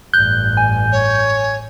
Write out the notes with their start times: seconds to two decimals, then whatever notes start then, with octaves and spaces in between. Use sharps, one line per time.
0.14 A1 G2 F#6 G6
0.57 G#5
0.92 C#5